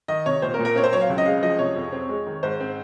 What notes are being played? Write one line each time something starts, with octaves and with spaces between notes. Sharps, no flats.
D#3 D#5
C3 C#5
A#2 C5
A#4
A#2
A#4
C4 C#5
C5
F#3 C#5
F5
C#2
D#5
G#3 F5
F3 D#5
C3 C#5
F2
C4
G#3
D#3
G#2 C5
C4